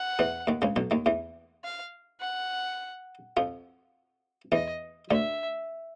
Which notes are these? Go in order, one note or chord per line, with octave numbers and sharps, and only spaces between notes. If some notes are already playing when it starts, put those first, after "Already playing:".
Already playing: F#5
E2 E3
D#2 D#3
C#2 C#3
B1 B2
D#2 D#3
E2 E3
F5
F#5
F2 F3
E2 E3 D#5
D2 D3 E5